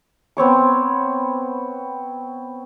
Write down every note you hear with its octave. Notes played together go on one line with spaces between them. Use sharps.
B3 C4 C#5 D6